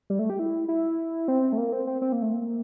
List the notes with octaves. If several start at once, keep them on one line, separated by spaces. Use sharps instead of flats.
G3
A3
G4
E4
E4
C4
A3
A#3
C4
C4
C4
A#3
A3
A#3